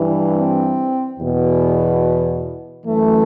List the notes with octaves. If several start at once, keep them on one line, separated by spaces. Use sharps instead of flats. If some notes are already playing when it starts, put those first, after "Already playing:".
Already playing: G2 E3
C4
E2 B2
F#2 E3 A3